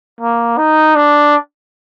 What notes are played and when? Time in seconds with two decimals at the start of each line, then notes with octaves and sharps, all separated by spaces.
0.20 A#3
0.58 D#4
0.96 D4